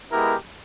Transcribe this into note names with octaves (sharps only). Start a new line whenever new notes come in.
G#3 B3 E4 G4 A#4